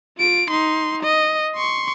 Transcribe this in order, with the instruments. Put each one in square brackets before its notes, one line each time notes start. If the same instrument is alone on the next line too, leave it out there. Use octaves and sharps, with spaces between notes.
[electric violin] F4 D7
D#4 C6
D#5
C6 C#6